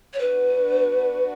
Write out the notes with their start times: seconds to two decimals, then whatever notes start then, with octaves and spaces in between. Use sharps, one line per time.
0.13 C#5
0.19 B3 D4 F#4 B4